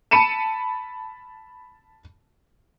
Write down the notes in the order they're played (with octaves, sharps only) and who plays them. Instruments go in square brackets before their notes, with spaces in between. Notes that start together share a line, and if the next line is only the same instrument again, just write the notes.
[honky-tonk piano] A5 B5 C#7 D#7 E7